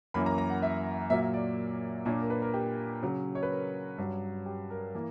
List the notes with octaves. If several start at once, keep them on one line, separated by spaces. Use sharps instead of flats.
F#2 E3 A#3 C#4 B5
A#5
A#5
F#5
E5
A#2 F#3 A#3 E5
D5
A#2 A#3 D4 C#5
A#4
B4
A#4
G4
C#3 F#3 C#4
C#5
B4
A#4
G2 F#3 C#4
G4
A#4
E3 A#3